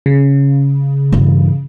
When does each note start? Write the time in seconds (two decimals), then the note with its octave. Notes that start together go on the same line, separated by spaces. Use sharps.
0.06 C#3
1.12 G2 E3